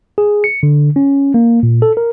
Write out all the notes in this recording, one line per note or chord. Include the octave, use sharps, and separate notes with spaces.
G#4
C#7
D3
C#4
A#3
A#2
A4
A#4